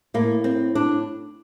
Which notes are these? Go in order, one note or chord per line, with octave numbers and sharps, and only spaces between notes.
A2 A#3
C4
D4